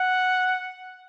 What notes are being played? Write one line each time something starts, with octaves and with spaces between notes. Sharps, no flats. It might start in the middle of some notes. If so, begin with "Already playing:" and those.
Already playing: F#5